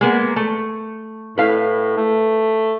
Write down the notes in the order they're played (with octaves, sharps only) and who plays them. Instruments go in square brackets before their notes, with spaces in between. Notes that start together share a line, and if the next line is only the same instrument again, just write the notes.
[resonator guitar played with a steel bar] G#3 A#3 B3
A3
[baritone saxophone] A2 [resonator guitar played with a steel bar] B4 F5
[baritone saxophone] A3